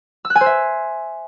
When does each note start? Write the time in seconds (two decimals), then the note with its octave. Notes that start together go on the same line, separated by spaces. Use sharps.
0.25 E6
0.30 F#6
0.35 G#5
0.41 C5
0.46 E5